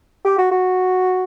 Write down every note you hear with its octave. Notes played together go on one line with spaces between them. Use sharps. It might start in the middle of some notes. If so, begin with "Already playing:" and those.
G4
F#4
F#4